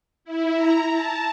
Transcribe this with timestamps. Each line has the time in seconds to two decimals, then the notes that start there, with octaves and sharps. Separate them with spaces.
0.25 E4
0.55 A#5
0.91 A5